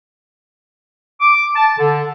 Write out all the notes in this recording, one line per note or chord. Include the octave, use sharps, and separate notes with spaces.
D6
A5
D3